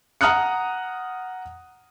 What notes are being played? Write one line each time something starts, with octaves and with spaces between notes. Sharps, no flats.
F#5 A#5 D#6 F6 F#6 C#7